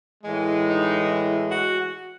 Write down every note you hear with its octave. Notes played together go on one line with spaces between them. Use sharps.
A2 E3 G#3
D#4
E4
F#4